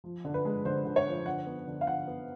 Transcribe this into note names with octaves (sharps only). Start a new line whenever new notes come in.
F3
D3
B4
G#3
D3 C5
D3
C#5
F3
D3 F#5
B3
D3
F5
D3 F#5
B3